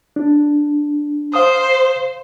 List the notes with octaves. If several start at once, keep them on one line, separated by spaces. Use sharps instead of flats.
D4
C5 F5 D#6